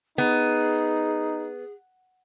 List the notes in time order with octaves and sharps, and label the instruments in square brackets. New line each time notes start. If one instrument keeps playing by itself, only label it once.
[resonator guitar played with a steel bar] B3 [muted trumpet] D#4 [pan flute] G#4